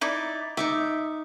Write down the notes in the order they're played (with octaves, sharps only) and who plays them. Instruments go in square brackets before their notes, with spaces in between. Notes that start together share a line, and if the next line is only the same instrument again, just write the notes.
[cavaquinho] D#4 E4 D5
[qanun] D#4 C#6 D6 [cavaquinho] E5